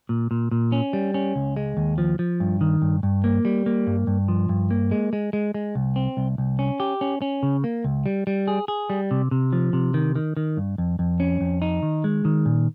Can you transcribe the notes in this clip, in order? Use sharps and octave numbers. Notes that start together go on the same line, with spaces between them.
A#2
A#2
A#2
C#4
G3
C#4
C#2
G#3
D#2
F3
F3
G2
D#3
G2
G2
A#3
G3
A#3
G2
G2
F3
G2
A#3
G#3
G#3
G#3
G#3
C2
C4
C2
C2
C#4
G4
C#4
C#4
C#3
A#3
C#2
G3
G3
G#4
G#4
G3
C3
C3
F3
C3
D#3
D#3
D#3
G2
F2
F2
C#4
F2
D#4
D#3
G#3
D#3
A#2